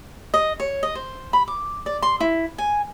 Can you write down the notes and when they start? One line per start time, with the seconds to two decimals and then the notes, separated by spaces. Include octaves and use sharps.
0.34 D#5
0.60 C#5
0.83 D#5
0.95 C5
1.33 B5
1.48 D6
1.86 D5
2.02 C6
2.20 E4
2.58 G#5